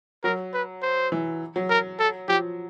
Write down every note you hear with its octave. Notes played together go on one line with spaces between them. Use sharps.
F#3 A#4
B4
C5
E3
F#3
A#4
A4
F3 G4